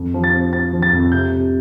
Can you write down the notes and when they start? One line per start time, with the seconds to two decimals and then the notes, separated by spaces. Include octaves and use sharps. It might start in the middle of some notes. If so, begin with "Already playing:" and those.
Already playing: F2
0.14 F3
0.24 A6
0.33 C4
0.53 C4 A6
0.73 F3
0.82 A6
0.93 F2
1.12 C3 G6
1.32 C3